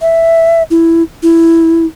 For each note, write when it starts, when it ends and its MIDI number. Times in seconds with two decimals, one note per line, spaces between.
0.01 0.63 76
0.70 1.03 64
1.23 1.86 64